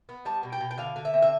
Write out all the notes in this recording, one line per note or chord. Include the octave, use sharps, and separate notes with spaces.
B3
G3 A5
B2
G5
B2
G5
D3 F5
D3
E5
C4
E5